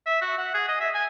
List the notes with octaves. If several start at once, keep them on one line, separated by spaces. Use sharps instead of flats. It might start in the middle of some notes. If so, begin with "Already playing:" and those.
E5
F#4
F#5
G#4
D#5
E5
G#5